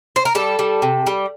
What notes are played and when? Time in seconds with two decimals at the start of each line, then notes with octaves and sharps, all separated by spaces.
0.16 C5
0.25 A#4
0.35 G3 A4
0.59 G3
0.82 C3
1.07 G3